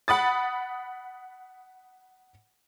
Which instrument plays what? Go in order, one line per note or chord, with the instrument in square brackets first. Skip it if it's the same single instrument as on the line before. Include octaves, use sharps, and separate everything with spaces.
[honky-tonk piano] F#5 B5 D#6 A6